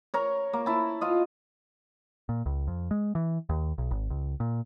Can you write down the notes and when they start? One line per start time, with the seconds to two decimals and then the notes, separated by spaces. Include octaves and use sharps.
0.14 A#4 C#5
0.53 A#3
0.66 E4 A5
1.01 F4 D#5
2.29 A#2
2.46 C#2
2.68 F2
2.91 G#3
3.15 E3
3.49 D#2
3.78 B1
3.91 G#1
4.10 C#2
4.40 A#2